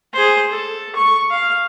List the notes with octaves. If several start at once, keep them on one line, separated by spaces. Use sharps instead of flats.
G#4 C5
A4
C#6
F5